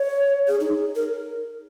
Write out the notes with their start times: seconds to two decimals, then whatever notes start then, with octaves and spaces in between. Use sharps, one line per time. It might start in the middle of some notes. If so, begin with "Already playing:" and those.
Already playing: C#5
0.48 G#4
0.60 D#4
0.96 A#4